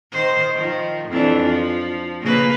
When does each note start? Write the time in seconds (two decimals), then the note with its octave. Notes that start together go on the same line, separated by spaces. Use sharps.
0.12 D#3 C5
0.55 D#3 F3
1.08 F2 E3 D4
1.44 F3
2.22 C#3 A#3 B4